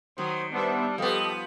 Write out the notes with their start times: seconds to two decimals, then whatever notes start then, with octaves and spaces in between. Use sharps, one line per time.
0.18 D#3 F#3 C5 D#6
0.53 G3 B3 D4 C5 E5
0.98 F3 B3 G4 A4 D#5